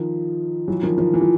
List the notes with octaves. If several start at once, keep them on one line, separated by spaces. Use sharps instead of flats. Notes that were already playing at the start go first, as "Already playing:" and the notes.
Already playing: D#3 F3
E3 F#3
D#3 F3
D#3 F3
E3
F3